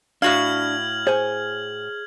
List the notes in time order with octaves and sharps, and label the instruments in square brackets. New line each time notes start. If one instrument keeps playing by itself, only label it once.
[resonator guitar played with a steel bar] A2 F#4 F5 [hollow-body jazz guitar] D4 [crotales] F6 G#6 F#7
[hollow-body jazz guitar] G#4 C#5 G#5 [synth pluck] C5